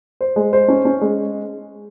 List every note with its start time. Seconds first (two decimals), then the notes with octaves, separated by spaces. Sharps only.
0.21 C5
0.36 G#3
0.53 C5
0.68 C#4
0.85 C#4
1.01 G#3